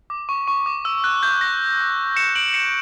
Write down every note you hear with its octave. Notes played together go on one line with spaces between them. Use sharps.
D6
C#6
C#6
D6
E6
F#6
G6
A#6
C#7 E7
D7 F#7
C#7 E7